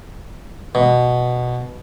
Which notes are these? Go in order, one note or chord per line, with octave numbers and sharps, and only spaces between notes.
B2